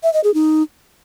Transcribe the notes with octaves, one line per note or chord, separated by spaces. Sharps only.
E5
D#5
G#4
D#4